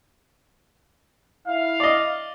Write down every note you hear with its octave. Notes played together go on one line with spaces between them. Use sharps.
E4 F5
D5 D#5